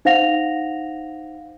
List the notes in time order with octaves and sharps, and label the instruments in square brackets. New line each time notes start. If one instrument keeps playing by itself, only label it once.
[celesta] D#4 C5 F5 F#5 A#6 F7